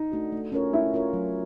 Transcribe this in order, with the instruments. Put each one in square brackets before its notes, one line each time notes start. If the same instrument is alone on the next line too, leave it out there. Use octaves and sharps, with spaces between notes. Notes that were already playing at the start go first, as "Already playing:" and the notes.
Already playing: [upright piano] D#4
[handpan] A3 D4 F#4
A3
C#4 F4 A#4 C#5
[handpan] A3 [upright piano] E4
[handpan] C#4 F4 A#4 C#5
F#3